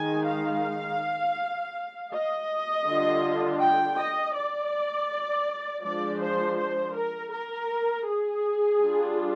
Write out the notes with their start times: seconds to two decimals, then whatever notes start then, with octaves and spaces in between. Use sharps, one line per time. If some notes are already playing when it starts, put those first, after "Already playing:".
Already playing: D#3 G#3 D#4 G#5
0.25 F5
2.11 D#5
2.86 D3 G3 D4 F4
3.60 G5
3.97 D#5
4.34 D5
5.83 F3 G#3 D4 D5
6.20 C5
6.58 C5
6.94 A#4
7.31 A#4
8.05 G#4
8.79 G3 D4 F4